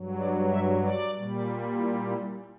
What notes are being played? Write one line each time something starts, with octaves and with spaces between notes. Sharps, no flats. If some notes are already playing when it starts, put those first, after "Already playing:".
Already playing: G2 F#3
D5
E5
D5
A#2 G3
E4
E4